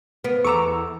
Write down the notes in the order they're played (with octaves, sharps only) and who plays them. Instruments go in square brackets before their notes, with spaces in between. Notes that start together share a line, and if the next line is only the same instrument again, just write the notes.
[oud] B3 [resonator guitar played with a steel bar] A#4
[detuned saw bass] E2 [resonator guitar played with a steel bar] A4 A#5 [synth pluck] C#6 D6 E6